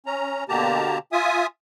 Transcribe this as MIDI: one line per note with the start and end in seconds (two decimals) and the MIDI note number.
0.06 0.44 61
0.06 0.44 82
0.49 0.98 47
0.49 0.98 50
0.49 0.98 58
0.49 0.98 67
0.49 0.98 81
0.49 0.98 82
1.12 1.47 65
1.12 1.47 76
1.12 1.47 80
1.12 1.47 87